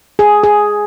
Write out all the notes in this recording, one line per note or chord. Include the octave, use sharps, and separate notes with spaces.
G#4
G#4